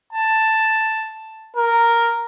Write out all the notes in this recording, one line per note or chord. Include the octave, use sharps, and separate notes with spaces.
A5
A#4